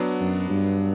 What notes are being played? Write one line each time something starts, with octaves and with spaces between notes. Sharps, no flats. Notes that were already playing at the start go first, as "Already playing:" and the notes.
Already playing: F#3 B3 D4
F#2
G2